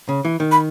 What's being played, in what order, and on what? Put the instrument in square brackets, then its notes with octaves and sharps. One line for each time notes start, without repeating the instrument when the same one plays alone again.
[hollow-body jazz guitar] C#3
E3
D#3
[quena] B5